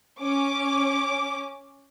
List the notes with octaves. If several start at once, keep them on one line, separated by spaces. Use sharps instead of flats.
C#4 D6